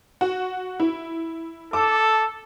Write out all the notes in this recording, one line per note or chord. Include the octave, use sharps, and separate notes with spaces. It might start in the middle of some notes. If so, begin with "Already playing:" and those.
F#4
E4
A4 A5 D6